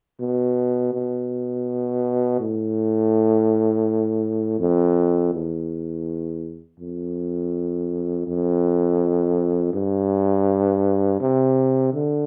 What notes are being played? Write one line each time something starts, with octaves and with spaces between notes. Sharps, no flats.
B2
B2
A2
F2
E2
F2
F2
G2
C3
D3